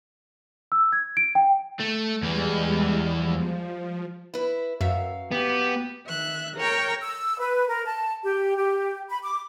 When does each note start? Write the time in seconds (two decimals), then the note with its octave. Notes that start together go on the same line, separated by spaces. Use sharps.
0.72 E6
0.92 G#6
1.17 D7
1.35 G5
1.80 A3
2.22 E2 E3 G3 G#3
3.13 F3
4.34 E4 B4
4.81 F#2 F#3 E5 F5
5.32 B3 G4
6.07 D#3 E5 F#6
6.56 A#4 C#5 G5 A#5
7.02 E6
7.39 B4
7.68 A#4
7.86 A5
8.23 G4
8.56 G4
9.10 B5
9.23 D6